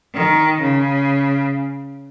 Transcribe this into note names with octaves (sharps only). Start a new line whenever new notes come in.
D#3
C#3